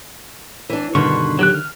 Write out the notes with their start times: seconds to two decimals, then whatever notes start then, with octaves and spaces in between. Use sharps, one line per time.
0.70 E3 D4
0.95 G2 B2 D3 D#3 B4 C6 C#6
1.39 F#3 G4 F#6
1.54 F6